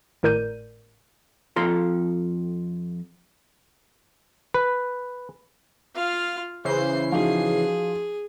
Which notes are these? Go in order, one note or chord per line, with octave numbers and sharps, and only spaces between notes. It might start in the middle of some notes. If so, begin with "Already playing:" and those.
G#1 A2 A#4 D5 G6 D#7
F2 F4 A4 F5 A#5 C6
B4
F4 F5
C#3 E3 C5 C7
F3 D#4 F#4 G#4